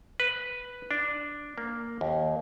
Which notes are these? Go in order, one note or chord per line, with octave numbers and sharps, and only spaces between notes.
B4
D4
A#3
D#2